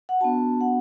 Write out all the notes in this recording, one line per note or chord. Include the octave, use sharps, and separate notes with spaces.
F#5
B3 D4 F#4 A5
F#5